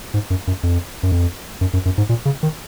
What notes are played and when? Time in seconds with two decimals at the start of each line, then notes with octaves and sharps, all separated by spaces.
0.14 G#2
0.30 F#2
0.47 F#2
0.63 F2
1.03 F#2
1.12 F2
1.61 F#2
1.73 F#2
1.85 F#2
1.98 G#2
2.09 A#2
2.25 C#3
2.43 D#3